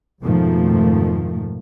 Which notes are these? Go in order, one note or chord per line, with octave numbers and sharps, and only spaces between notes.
F2 G#2 B2 D#3 F3 A3